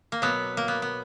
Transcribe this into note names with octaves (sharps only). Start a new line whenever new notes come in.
A#3
B2 F#3 B3
A#3
B3
B3